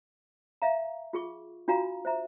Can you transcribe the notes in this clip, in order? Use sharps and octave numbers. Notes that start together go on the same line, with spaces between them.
E5 F5 A#5
F4 G#4 C#6
D4 F4 F#4 F5 A#5
C5 E5 A#5